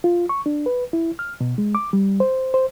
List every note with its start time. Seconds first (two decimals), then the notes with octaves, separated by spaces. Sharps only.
0.04 F4
0.29 C#6
0.46 D4
0.66 B4
0.93 E4
1.19 F6
1.41 B2
1.58 G#3
1.75 D6
1.93 G3
2.20 C5
2.54 C5